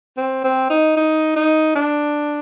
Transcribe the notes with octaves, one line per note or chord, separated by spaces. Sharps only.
C4
C4
D#4
D#4
D#4
D4